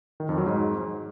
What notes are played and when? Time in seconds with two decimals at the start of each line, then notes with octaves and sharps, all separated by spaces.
0.20 D#3
0.29 F2
0.38 F#3
0.46 G#2